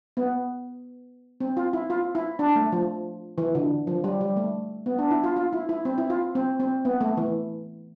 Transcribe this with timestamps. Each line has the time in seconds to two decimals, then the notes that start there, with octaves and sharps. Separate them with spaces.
0.17 B3
1.40 C4
1.57 F4
1.73 E4
1.90 F4
2.15 E4
2.39 D4
2.56 A3
2.72 F3
3.38 E3
3.55 D3
3.87 F3
4.04 G3
4.21 G3
4.37 A3
4.86 B3
4.99 D4
5.11 E4
5.24 F4
5.36 F4
5.53 E4
5.69 E4
5.85 C4
5.98 E4
6.10 F4
6.35 C4
6.60 C4
6.85 B3
7.01 A3
7.17 E3